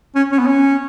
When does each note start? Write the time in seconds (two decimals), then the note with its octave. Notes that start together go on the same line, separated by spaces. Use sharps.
0.15 C#4
0.32 C#4
0.39 B3
0.47 C#4